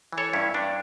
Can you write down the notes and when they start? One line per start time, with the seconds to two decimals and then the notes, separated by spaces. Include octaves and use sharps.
0.13 E3
0.18 A4 C#5
0.33 G2 C#4 E4
0.54 G2 D4